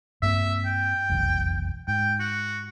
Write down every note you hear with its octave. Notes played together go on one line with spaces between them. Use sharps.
G2 A#3 C4 E5
G5
F1 B1 E2
G#2 G5
F#4